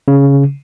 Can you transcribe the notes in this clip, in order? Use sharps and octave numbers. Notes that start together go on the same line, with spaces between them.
C#3